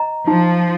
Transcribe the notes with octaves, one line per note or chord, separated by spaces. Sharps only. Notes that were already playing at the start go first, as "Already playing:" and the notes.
Already playing: D#5 A#5
F3 D#4